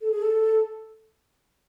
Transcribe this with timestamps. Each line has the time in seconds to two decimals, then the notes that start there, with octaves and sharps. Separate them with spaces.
0.01 A4
0.11 G#4
0.22 A4